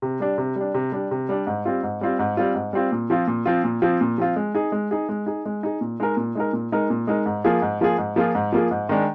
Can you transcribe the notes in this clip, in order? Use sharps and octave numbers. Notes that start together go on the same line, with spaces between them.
C3
G3 D4
C3
G3 D4
C3
G3 D4
C3
G3 D4
G#2
G3 C4 F4
G#2
G3 C4 F4
G#2
G3 C4 F4
G#2
G3 C4 F4
A#2
F3 C4 F4
A#2
F3 C4 F4
A#2
F3 C4 F4
A#2
F3 C4 F4
G#3
D#4 G#4
G#3
D#4 G#4
G#3
D#4 G#4
G#3
D#4 G#4
A#2
G#3 D#4 A#4
A#2
G#3 D#4 A#4
A#2
G#3 D#4 A#4
A#2
G#3 D#4 A#4
G#2
F3 A#3 F4 G#4
G#2
F3 A#3 F4 G#4
G#2
F3 A#3 F4 G#4
G#2
F3 A#3 F4 G#4
G#2
D#3 G#3 D4